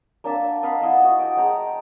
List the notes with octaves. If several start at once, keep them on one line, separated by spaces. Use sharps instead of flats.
A#3 D4 E5 A5
D#5 F5 F#5 B5
E4 D#5 F5 A5
F#4 D#5
G5 D6
G#3 G5 A#5